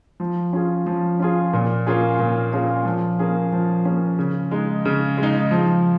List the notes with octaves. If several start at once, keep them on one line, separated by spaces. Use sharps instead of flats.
F3
C#4 F4 G#4
F3
C#4 F4 G#4
A#2
A#3 C#4 F4 G#4
A#2
A#3 C#4 F4 G#4
F3
A#3 C#4 G#4
F3
A#3 C#4 G#4
C#3
G#3 D#4
C#3
G#3
D#4
F3